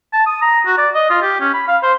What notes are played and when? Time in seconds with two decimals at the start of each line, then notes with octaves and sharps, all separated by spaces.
0.13 A5
0.26 D#6
0.42 A#5
0.66 F#4
0.78 D5
0.95 D#5
1.10 F4
1.22 G4
1.41 C#4
1.54 B5
1.68 F5
1.83 C5